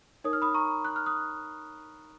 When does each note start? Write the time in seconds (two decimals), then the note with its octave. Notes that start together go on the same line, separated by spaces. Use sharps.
0.24 D#4 A#4 C#5 D#6
0.33 F6
0.42 B5 D#6
0.54 A#5 C#6
0.85 F#6
0.96 F6
1.06 D#6 F#6